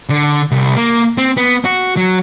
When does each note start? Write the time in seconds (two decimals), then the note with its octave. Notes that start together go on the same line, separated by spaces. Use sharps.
0.10 D3
0.51 C2
0.76 A#3
1.18 C4
1.37 B3
1.65 F#4
1.97 F#3